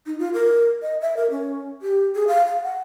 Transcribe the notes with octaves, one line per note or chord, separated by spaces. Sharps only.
D#4
F4
A#4
D#5
E5
A#4
C#4
G4
G#4
F5
F5
F#5